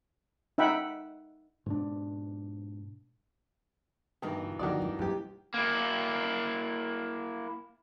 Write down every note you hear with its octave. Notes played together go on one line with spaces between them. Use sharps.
D#4 E5 F#5 G5 B5
G#2 B2 D4
G2 B2 D#3 E3
F#1
D3 D#3 F3 F#4 D5
G#3
D#2 G3 G4
A#3 E4